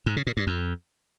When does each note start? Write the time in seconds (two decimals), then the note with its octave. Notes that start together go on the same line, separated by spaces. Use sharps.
0.06 G#2
0.16 C#3
0.27 A#2
0.37 G2
0.47 F2